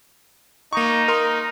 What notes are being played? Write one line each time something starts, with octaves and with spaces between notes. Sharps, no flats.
A#3 D#4 C#6
A#4 C6